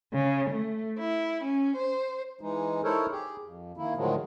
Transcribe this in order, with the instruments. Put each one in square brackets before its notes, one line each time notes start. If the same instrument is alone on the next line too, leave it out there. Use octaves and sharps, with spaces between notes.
[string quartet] C#3
A3
E4
C#4
C5
[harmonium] E3 G#3 D#4
D#4 E4 A4 A#4 C5 C#5
G4 G#4
F2
D#3 A#3 E4
A2 D3 D#3 F3 F#3 G#3